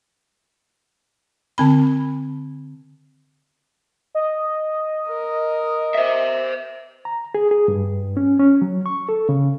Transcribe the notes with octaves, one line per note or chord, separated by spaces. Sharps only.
D3 C4 B5
D#5
A#4
C5 E5
A#5
G#4
G#4
G2
C#4
C#4
F#3
C#6
A4
C#3